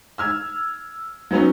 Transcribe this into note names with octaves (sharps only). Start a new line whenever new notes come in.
E6 F6 G#6
F#3 B3 C#4 D#4